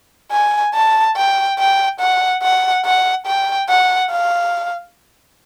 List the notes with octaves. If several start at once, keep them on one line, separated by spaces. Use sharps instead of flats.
G#5
A5
G5
G5
F#5
F#5
F#5
G5
F#5
F5